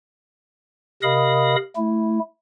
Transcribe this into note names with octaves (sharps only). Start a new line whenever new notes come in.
C3 A#4 D#5 F5 B5 D#6
A3 E4